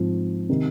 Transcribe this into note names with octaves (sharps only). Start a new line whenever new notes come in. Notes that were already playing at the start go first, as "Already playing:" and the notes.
Already playing: G#2 F3 C4
C3 D#3